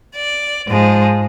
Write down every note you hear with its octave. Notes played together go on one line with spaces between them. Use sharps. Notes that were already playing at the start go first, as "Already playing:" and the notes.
D5
G#2 F3 G#3